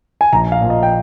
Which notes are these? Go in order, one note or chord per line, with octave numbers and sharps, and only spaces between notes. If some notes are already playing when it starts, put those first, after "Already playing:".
G#5
A#1 A#5
F5
A#2 F3
D#5
G5